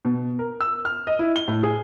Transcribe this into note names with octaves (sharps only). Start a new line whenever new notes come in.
B2
A#4
E6
F6
D#5
E4
G7
A2
G#4